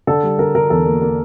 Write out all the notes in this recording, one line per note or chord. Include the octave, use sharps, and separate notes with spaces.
D3 A4
G3
D3 A#4
D3 A#4
E2 A4
A#3
A#3